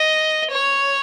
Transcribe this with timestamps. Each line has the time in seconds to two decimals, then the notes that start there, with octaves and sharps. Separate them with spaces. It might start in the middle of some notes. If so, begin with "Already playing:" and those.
Already playing: D#5
0.51 C#5